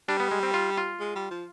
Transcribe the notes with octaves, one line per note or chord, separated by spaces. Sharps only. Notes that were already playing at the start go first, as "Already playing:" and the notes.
G3 D4
B3
G#3
C4
F4
F4
G#3
G3
F3